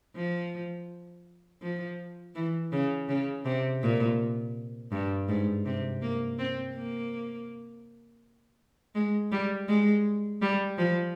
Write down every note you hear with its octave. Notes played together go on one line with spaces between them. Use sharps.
F3
F3
E3
C#3
C#3
C3
A#2
G2
G#2
C3
A#3
C4
A#3
G#3
G3
G#3
G3
F3